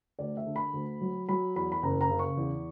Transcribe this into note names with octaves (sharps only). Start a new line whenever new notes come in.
D2 D5
E5
D3
B5
D2
F#3
F#3 B5
E2 B5
B5
F#1 A#5
A#5
C#3
C#6
E2